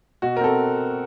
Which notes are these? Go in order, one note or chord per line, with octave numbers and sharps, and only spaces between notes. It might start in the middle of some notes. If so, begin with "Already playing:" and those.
B2 F#4
A#4
C4 A4